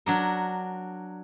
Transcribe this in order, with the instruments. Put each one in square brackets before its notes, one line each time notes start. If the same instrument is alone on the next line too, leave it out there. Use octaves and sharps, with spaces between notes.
[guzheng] F#3 D4 A#4